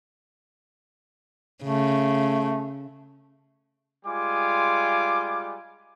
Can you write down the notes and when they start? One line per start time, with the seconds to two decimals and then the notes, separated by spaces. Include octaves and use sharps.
1.63 C#3 A3
4.05 G3 G#3 F4 G#5 D6